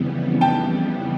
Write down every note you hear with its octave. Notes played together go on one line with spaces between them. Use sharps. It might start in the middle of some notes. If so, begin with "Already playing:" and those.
Already playing: F2 C#3 E3 G3 B3
G5 A5